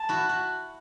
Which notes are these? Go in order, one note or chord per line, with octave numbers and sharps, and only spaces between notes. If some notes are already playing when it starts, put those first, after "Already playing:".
Already playing: A5
E4 F#4
F#4